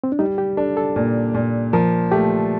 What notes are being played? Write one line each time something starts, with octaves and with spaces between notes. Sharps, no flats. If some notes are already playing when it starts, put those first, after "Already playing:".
C4
D4
G3 D#4
G4
D4 A4
A4
A#2
A#2
F3 A#4
A3 G4